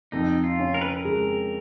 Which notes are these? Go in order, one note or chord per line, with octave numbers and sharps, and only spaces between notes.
F2 D#4
F4
C#4
A#4
B4
A#4
G#3